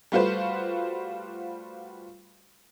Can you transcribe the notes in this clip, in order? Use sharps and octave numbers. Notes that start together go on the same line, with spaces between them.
G3 A3 F4 F#4 B4 C5